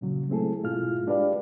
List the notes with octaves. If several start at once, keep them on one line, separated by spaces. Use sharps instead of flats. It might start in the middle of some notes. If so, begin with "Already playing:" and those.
A#2 C#3 F#3
G#3 A3 C4 E4 G#4 A4
G#2 B2 G#3 E4 F4 F6
G#3 D4 G4 B4 D5 F5